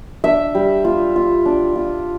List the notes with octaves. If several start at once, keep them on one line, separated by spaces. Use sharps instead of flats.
D4 E5
G3
F4
F4
D4
F4